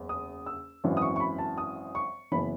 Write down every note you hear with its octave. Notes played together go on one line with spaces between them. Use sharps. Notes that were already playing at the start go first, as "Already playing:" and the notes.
Already playing: F#1 E2
D#6
E6
G#1 F#2 E3
D#6
C#6
C#6
B5
A5
D#6
C#6
F#1 E3 B3 B5